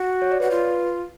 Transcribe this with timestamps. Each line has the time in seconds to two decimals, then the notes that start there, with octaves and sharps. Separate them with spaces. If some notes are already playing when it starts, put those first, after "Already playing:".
Already playing: F#4
0.22 C#5
0.32 D5
0.40 F#4 B4
0.51 F4